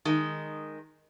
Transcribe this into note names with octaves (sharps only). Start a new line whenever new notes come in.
D#3 G#3